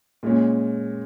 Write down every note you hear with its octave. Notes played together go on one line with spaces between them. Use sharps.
A#2 G#3 C#4